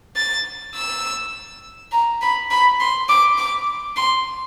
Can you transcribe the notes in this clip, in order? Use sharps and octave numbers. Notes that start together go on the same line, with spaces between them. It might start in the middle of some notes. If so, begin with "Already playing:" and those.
A6
E6
A#5
B5
B5
C6
D6
D6
C6